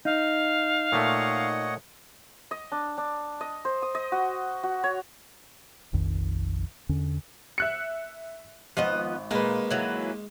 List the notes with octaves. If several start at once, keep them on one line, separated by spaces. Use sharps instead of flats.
D#4 F5
A#2 A3 C#5 D#5 F#5
D#5
D4
D4
D#5
C5
D#6
D#5
F#4
F#4
C#5
F1 A#1 F2 D#3
E2 D3 C#4
E5 F#6 C#7
G#1 F3 B3 D#5
A#2 G#3 A#3 B4
E3 F#3